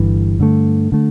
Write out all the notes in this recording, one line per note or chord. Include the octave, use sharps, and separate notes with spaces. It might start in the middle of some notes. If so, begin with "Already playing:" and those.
Already playing: G1 G2 E3
G2 D3 A3
D3 A3